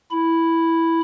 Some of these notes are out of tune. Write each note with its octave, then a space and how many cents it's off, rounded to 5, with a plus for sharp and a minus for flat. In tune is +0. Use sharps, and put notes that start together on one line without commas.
E4 +0 B5 +0